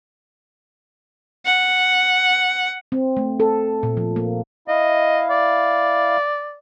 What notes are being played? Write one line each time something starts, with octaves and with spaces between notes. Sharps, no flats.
F#5
C4
A3
A4
A#2
F3
A#3
E4 D#5 F5
D5